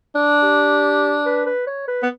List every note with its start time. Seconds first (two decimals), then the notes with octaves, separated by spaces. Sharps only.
0.15 D4
0.42 G4
1.26 B4
1.46 B4
1.67 C#5
1.88 B4
2.03 B3